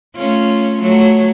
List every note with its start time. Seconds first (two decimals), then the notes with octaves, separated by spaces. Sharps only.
0.16 A3 C#4 F4
0.81 F#3 A3